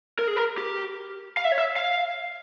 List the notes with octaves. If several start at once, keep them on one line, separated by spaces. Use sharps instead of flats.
A#4
G#4
A#4
G4
F5
E5
C#5
E5
F5